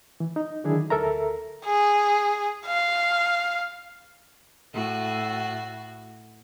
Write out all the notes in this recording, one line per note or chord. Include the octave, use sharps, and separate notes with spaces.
E3
D#4
D3 D#3 F#3 D4 E4 G#4
D2 A4 A#4 E5 A#5
G#4
F5
A2 F#4